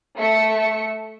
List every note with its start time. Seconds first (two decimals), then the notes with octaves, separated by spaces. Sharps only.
0.18 A3 E5 C#7